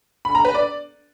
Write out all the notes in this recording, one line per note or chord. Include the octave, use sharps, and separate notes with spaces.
B5
A#5
B4
D5